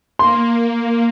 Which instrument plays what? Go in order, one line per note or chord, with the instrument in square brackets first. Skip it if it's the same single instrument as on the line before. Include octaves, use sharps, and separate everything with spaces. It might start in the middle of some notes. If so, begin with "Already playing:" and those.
[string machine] A#3 [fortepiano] C6